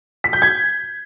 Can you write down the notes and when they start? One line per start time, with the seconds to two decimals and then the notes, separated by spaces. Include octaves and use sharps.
0.24 B6
0.33 G6
0.42 G#6